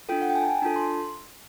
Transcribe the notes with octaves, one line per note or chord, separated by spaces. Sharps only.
D4 F4 A4 G5
F#5
G5
G#5
A5
G#5
D4 F4 A4 A5
C6